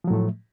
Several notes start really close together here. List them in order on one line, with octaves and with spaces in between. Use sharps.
F3 F#3 A2 A3